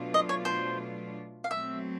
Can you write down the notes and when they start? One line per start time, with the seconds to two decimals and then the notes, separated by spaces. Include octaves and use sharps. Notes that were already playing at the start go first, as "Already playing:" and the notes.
Already playing: B2 F#3 A3 D4 F4
0.14 D#5
0.29 C#5
0.45 C5
1.44 F5
1.51 B2 F#3 A3 C4 E5